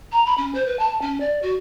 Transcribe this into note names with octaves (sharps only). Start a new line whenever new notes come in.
A#5
B5
C#4
C5
B4
A5
C#4
D5
F#4